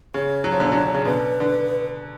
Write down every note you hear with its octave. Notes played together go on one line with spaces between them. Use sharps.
C#3 C#5
F#3
F3
B2 D3
D3 F#3
C#3
B2 D3 B4
D3